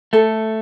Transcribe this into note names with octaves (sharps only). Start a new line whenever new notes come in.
A3 A4